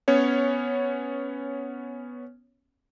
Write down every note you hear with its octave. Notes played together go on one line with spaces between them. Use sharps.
B3 C#4 C#5